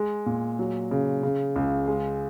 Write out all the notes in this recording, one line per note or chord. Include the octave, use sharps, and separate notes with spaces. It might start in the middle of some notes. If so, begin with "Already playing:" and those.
Already playing: G#3
A#2
F#3
C#3
C#3
C#2
G#3